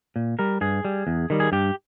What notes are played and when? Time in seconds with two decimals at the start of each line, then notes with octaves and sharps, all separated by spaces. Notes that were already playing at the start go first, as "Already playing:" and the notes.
0.16 A#2
0.39 G3 A#4
0.61 G2 G#4
0.85 G3
1.07 E2
1.30 D#3 G3
1.40 G#4
1.52 G2 G4